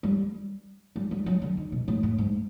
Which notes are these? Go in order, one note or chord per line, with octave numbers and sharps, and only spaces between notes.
G3
G3
G3
F#3
D3
D#3
B2
A2
A2
G#2